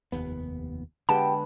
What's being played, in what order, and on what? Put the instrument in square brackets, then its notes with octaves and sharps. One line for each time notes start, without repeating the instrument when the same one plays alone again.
[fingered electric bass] F1 D#2 B3
[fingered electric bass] D3 G#3 [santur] B3 [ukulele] G4 G5 [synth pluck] A5